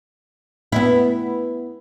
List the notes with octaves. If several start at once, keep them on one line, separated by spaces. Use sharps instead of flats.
B3 E4